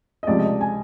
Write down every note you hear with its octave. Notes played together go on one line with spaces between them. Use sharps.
D#5
C#2 C3 F3 D5
D#5
D5
G#5